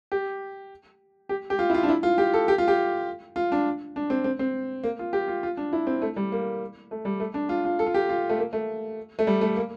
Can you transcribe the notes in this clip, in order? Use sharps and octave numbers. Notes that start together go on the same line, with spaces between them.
G4
G4
G4
F4
E4
F4
D4
E4
F4
G4
A4
G4
F4
G4
F4
D4
D4
C4
C4
C4
A#3
F4
G4
F4
F4
D4
E4
C4
A3
G3
A#3
A3
G3
A3
D4
F4
F4
A4
F4
G4
F4
A3
A#3
A3
A3
G3
A3
A#3